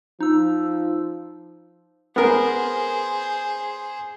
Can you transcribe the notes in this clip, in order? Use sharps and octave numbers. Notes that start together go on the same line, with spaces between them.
F3 D#4 E6
B3 G#4 A#4 C5